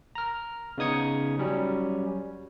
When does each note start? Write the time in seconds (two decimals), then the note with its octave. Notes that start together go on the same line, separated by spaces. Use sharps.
0.15 A#5 F6
0.78 C#3 B3 D#4 D#6 G#6 C#7
1.38 F#3 G3 C#4